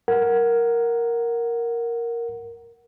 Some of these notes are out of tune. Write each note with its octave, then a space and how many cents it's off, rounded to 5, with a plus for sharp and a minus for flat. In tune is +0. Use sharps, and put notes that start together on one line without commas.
A#4 +0 F#5 +0